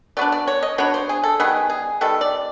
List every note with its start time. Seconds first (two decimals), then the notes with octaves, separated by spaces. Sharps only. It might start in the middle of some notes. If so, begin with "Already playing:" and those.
0.17 F#3 B3 D4 D5
0.32 D5
0.48 C#5
0.63 D#5
0.78 F#3 B3 D4 C#5
0.94 C5
1.09 G#4
1.24 A4
1.40 D#3 G3 B3 G#4
1.70 G#4
2.01 D#3 G3 B3 A4
2.21 D5